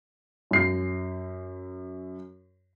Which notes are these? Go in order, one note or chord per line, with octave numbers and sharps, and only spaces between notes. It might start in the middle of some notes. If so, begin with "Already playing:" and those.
F#2 C7